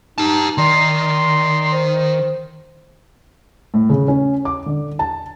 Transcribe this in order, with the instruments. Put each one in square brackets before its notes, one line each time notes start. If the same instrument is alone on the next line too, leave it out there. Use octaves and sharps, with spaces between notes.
[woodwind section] D#4 [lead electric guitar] G4 A5
[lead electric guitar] D#3 [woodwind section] D5 A#5 C6
[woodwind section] C5
[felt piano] A2
C#3
C#4
D6
D3
A5